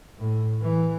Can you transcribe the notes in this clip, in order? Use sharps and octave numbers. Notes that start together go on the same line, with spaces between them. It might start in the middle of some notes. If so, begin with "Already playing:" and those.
A2
E3